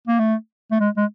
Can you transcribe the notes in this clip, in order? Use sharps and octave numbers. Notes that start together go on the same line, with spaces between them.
A#3
A3
A3
G#3
G#3